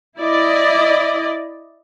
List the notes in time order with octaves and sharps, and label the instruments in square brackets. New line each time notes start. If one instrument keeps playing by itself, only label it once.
[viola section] E4 D5 D#5